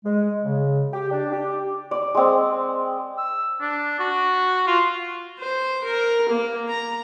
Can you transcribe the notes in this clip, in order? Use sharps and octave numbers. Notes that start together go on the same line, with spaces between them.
G#3
C#3
G4
D4
G4
D5
G#3 C4
E6
D4
F#4
F4
C5
A#4
A#3
A#5